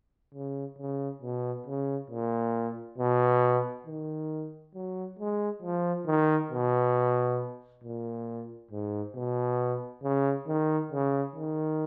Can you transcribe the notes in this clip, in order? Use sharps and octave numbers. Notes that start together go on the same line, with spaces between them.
C#3
C#3
B2
C#3
A#2
B2
D#3
F#3
G#3
F3
D#3
B2
A#2
G#2
B2
C#3
D#3
C#3
D#3